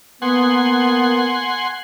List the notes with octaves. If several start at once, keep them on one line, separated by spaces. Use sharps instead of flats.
A#3 B3 F#5 G#5 C6